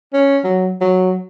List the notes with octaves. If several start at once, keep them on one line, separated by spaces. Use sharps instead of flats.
C#4
F#3
F#3